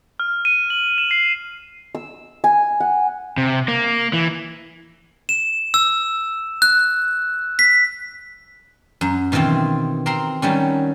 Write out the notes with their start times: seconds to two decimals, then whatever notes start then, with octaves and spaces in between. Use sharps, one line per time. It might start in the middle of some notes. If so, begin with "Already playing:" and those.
0.20 F6
0.45 D#7
0.70 F#7
0.98 E7
1.11 C7
1.95 E6
2.44 G#5
2.80 F#5
3.38 C3
3.68 A#3
4.13 E3
5.29 E7
5.74 E6
6.62 F#6
7.59 B6
9.01 F#2
9.32 B2 D#3 E3 C4 F4
10.06 C4 A#4 A#5 C6
10.42 D#3 F#3 G3 C#4